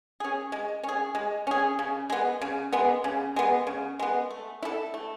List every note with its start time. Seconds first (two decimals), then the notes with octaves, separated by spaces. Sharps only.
0.20 C#4 G#4
0.52 G#3
0.83 C#4
0.89 G#4
1.15 G#3
1.47 C#4 G#4
1.79 C#3
2.10 G#3 B3
2.41 C#3
2.73 G#3 B3
3.04 C#3
3.36 G#3 B3
3.67 C#3
3.99 G#3 B3
4.30 A3
4.63 E4 A4
4.94 A3